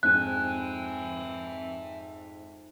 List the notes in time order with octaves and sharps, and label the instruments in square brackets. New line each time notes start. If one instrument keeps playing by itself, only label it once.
[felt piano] F2 G#2 [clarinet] C4 [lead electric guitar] E5 G#5 [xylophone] F#6